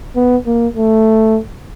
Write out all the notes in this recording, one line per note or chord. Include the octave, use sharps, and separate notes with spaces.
B3
A#3
A3